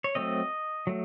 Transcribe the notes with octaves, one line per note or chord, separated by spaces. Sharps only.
C#5
F#3 A3 C4 D#5
F#3 A3